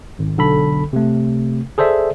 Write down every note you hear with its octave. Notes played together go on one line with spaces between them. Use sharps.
G#1
B1 D3 A4 B5
C3 A3
G#4 A4 C5 D5 E5